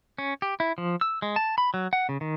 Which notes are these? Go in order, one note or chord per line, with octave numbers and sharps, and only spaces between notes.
C#4
G4
E4
F3
E6
G#3
A5
B5
F#3
F#5
C#3
D#3